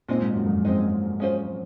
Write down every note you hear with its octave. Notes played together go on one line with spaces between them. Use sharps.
A#2 G#3 C4 D#4
G#2
F#2
F2 G#2
G#3 C4 D#4
G#3 C#4 F4 C5